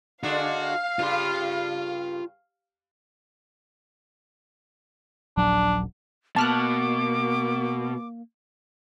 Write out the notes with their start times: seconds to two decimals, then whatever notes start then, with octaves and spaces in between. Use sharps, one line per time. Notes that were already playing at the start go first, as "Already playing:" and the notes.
0.23 D3 G#3 D4 F#4 F5
0.99 G2 C#3 F4 C6
5.37 D#1 A#1 F#3 D4
6.36 B2 A#3 A5 D6 F6 F#6